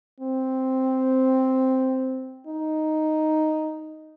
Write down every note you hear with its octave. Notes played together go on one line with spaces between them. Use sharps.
C4
D#4